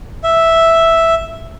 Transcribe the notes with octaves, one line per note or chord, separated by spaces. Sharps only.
E5